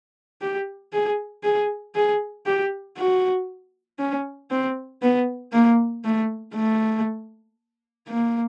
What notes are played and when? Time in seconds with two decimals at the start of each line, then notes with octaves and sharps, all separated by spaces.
0.42 G4
0.93 G#4
1.43 G#4
1.95 G#4
2.46 G4
2.98 F#4
3.99 C#4
4.51 C4
5.02 B3
5.52 A#3
6.05 A3
6.55 A3
8.08 A#3